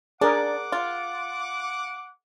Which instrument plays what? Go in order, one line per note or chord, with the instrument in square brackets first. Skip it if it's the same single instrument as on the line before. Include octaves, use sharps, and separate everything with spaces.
[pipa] D4 [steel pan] G#4 A#4 [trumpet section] F#5 D6
[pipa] F4